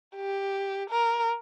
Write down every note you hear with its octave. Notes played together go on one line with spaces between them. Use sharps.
G4
A#4